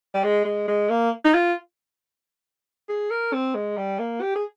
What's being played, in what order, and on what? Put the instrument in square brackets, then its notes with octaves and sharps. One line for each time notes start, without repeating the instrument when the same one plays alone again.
[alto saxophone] G3
G#3
G#3
G#3
A#3
D#4
F4
G#4
A#4
C4
G#3
G3
A#3
G4
G#4